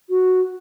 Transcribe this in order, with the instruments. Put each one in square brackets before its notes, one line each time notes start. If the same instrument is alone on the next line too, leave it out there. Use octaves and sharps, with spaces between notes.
[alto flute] F#4